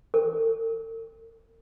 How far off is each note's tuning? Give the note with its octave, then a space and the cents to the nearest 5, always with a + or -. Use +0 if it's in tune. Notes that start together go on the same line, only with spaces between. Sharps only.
A4 +45